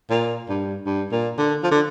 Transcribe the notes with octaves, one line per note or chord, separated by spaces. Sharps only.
A#2
G2
G2
A#2
D3
F3
D3